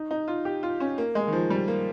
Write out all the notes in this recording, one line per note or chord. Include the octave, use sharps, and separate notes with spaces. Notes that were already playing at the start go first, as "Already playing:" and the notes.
Already playing: D#4
D#4
F4
G4
F4
C#4
A#3
G#3
D#3
F3
G3
A#3